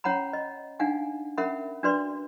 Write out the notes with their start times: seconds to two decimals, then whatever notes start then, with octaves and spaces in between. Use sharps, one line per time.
0.04 C#4 C#5 F#5 A#5 B5
0.33 D#5
0.79 D4 D#4 F5 F#5 G#5
1.38 C#4 A#4 E5 F#5 B5
1.83 D4 F#4 B4 D5 C6